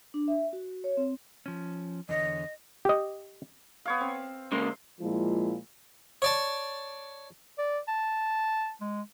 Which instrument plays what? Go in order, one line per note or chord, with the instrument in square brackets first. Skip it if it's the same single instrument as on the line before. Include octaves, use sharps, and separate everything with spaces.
[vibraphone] D4
E5
F#4
C#5
C4
[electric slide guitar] F3 C#4
[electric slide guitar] E2 D3 C#5 [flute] D#5
[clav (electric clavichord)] G4 D#5
[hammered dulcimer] B3 C#5 F5
C4
[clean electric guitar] C#3 G#3 A#3 [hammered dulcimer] C6
[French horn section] A#2 F3 G#3 E4 F4
[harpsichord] C#5 D5 A5
[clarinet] D5
A5
G#3